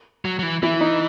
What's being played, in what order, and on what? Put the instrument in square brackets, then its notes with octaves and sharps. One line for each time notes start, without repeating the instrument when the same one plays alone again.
[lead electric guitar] F#3
F#3
E3
[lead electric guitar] E3 [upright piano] E4
[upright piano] D#4